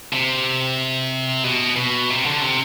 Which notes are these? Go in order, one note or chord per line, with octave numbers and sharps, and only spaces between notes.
C3
B2
B2
C3
D3
C3